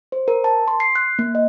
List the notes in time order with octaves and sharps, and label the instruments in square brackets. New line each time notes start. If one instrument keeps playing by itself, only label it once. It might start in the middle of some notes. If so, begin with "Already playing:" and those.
[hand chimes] C5
A#4
A5
C6
C7
F#6
A#3
D#5